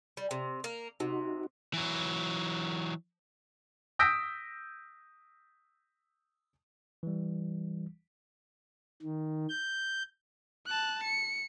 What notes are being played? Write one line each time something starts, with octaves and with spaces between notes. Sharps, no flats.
G3
C3
A#3
C3 D#4 F#4
E3 F#3
D#6 E6 G6 A#6 B6 D7
E3 G3
D#3
G6
A5 F#6
C#7